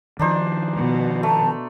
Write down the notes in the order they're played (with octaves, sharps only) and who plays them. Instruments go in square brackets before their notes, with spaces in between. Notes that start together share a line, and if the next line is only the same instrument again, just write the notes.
[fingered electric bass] D#3 F3 [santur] D4 D#4 C5
[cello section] B2
[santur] A3 [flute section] A5 A#5